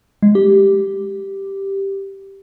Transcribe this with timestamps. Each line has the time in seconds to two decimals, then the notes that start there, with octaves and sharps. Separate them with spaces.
0.23 G#3
0.35 G4